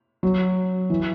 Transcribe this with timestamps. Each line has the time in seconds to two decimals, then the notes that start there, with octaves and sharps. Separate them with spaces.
0.23 F#3
0.90 E3